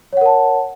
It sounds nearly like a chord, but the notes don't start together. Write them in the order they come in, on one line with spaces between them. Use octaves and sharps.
C#5 F#5 A#4 A5